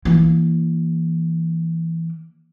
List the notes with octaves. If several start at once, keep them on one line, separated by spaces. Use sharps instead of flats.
E3 A#3